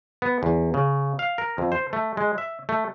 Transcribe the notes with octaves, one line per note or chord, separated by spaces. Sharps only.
B3
E2
C#3
F5
A#4
F2
C5
A3
G#3
E5
A3